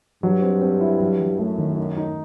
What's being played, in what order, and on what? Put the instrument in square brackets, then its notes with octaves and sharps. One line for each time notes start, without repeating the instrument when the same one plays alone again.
[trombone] G2 [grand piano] F#3
[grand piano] C4
C4
E4
F#3
F#3
[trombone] F#2 [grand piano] A3
[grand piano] D#3
D#4
D#4